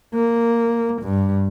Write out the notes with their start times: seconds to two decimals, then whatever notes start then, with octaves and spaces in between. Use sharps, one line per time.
0.15 A#3
1.02 G2